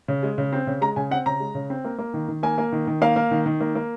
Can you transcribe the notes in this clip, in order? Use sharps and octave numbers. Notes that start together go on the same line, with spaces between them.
C#3
G#3
C#3
C4
C#3
G#3 A#5
C#3 G#5
C4 F#5
C#3 A#5
G#3
C#3
C4
A#3
A#3
D#3
D#3
A#3 G#5
A#3
D#3
D#3
A#3 F5
A#3
D#3
D#3
A#3
A#3